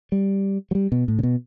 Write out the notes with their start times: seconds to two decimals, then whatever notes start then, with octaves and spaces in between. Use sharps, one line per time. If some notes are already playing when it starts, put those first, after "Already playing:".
0.12 G3
0.71 F#3
0.75 G3
0.92 B2
1.08 A2
1.19 C#3
1.23 B2